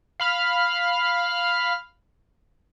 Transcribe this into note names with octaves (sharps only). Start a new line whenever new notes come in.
F5 B5 F6